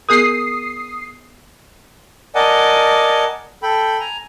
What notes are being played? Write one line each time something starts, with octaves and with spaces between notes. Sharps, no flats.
B3 G#4 A#4 D#6 C7
A#4 D5 D#5 F#5 G#5 A5
A4 G5 B5
G#5 A#5